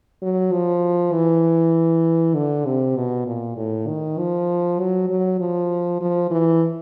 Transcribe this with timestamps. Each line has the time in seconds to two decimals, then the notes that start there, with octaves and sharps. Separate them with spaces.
0.22 F#3
0.52 F3
1.13 E3
2.35 D3
2.66 C3
2.97 B2
3.27 A#2
3.57 A2
3.88 D#3
4.18 F3
4.80 F#3
5.09 F#3
5.40 F3
6.01 F3
6.31 E3